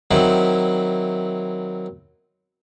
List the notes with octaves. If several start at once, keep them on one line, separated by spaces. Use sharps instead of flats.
D#3 F#3 C4 E4